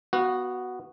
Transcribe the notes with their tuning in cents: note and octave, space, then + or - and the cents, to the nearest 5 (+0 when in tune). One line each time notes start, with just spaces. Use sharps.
B3 +0 F#4 +5 F5 +35